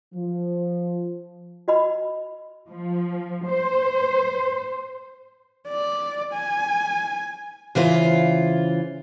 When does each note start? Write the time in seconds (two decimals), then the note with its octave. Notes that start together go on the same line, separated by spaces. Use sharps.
0.15 F3
1.68 F#4 D#5 B5
2.69 F3
3.47 C5
5.68 D5
6.34 G#5
7.75 C#3 E3 F4 C5